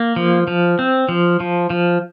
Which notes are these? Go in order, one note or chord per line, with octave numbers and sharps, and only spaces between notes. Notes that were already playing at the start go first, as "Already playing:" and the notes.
Already playing: A#3
F3
F3
C4
F3
F3
F3